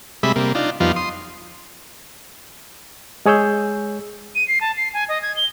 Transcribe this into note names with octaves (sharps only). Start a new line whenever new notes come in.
C3 G3 G#3 E5 B5
C3 G3 A#3
D4 D#4 F4
F2 F3 G3 B3 D#4 F4
C6 D#6
G#3 G#4 C#5 E6 G6
D#7
C7
A5
C7
G#5
D#5
G#6
G7